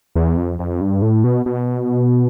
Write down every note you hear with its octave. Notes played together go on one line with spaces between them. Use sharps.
E2
F2
F2
G2
A2
B2
B2